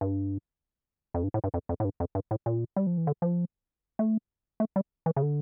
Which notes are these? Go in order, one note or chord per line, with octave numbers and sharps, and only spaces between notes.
G2
F2
G2
A2
G2
F2
F2
A2
G2
F2
G2
A2
A#2
G3
F3
E3
D3
F3
A3
A3
G3
E3
C#3
D3